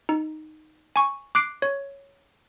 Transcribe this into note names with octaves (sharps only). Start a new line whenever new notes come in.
D#4
G#5 C#6
D6 F#6 C7 D7
C#5